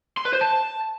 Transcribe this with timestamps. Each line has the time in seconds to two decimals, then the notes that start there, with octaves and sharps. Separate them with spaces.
0.17 C6
0.25 B4
0.33 C5
0.41 A5